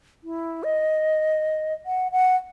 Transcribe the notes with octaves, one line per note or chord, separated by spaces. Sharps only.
E4
D#5
F#5
F#5